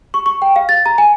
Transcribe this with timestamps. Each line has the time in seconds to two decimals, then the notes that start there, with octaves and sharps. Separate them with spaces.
0.14 C#6
0.26 C#6
0.42 G5
0.56 F5
0.69 A6
0.86 A#5
0.98 G#5